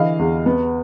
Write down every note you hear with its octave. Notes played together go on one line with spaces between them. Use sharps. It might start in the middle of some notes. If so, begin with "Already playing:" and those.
Already playing: D3 E3 D#5 F5
E2
B3